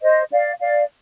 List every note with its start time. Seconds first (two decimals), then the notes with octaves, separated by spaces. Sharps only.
0.02 C5 D#5
0.32 D5 F5
0.61 D5 F5